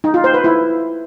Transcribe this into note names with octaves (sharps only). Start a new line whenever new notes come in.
D#4
F4
C5
B4
E4